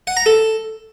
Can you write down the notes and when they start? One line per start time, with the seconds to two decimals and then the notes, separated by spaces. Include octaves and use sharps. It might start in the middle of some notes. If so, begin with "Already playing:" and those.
0.07 F#5
0.17 A#5
0.26 A4